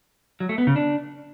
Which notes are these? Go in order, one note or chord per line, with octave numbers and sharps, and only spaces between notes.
F#3
A3
B3
C#3
D4